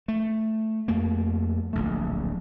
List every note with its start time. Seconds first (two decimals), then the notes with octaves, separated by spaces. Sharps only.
0.08 A3
0.88 F2 A3 A#3
1.73 D1 A#1 A3